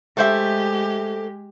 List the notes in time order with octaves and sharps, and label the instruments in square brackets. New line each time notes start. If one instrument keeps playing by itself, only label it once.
[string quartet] G#3 G4 [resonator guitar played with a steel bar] A3 C5 E5